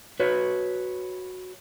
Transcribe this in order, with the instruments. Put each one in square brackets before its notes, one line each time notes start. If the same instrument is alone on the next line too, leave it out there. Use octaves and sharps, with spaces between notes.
[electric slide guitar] F#4 B4 C#5